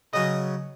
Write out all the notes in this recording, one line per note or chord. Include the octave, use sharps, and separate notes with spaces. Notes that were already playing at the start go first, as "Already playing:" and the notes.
C#3 F#3 C#4 D#5